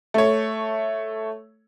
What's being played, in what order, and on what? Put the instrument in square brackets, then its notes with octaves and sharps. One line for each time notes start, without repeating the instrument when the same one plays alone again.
[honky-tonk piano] A3 C#5